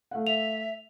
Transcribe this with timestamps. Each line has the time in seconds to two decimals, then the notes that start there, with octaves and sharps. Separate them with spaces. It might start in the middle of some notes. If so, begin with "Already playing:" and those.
0.11 A3 F5 F#5
0.27 E5 F7